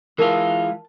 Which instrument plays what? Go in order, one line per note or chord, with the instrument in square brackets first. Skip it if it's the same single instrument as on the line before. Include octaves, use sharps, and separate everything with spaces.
[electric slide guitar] E3 G#3 F4 [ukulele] A#4 A5